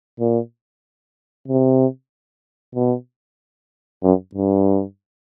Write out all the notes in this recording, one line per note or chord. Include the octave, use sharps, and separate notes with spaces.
A#2
C3
B2
F#2
G2